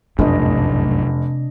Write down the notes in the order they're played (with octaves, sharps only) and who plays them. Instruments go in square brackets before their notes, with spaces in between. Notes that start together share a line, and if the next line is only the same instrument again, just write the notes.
[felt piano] F1 [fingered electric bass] B1 F#2 A2 [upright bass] C3 [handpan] D4 D#5